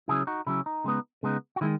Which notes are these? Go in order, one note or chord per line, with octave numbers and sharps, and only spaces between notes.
C#3 F#3 C#4 E4 G#4
D#4 F#4
C#3 F#3 C#4 E4
D#4
C#3 G#3 B3 D#4
C#3 G#3 B3 D#4
F#4
D#3 G#3 E4